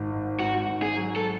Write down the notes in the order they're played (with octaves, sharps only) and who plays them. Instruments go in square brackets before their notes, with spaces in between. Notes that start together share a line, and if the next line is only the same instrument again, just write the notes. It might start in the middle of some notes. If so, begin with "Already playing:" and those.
Already playing: [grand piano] G#1 G#2
G#2
[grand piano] G#2 [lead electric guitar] F#4
[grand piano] G#1
[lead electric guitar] G#4
[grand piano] F#3
[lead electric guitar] A4